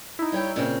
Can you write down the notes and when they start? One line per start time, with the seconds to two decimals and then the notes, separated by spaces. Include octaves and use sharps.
0.19 D#4 E4
0.32 G3 C#5 G5
0.56 A#2 C#3 C4